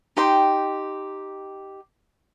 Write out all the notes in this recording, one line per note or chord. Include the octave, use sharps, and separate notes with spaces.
D#4 G4 G5 C6